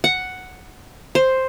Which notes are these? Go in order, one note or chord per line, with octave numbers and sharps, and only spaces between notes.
F#5
C5